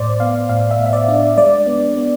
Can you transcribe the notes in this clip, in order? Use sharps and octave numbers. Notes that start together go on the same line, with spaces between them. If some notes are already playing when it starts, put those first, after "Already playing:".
Already playing: A2 C5 D5
B3 F5
A2 F5
E5
A2
E5
D5
D4
D5
G#3 D5
B3
B3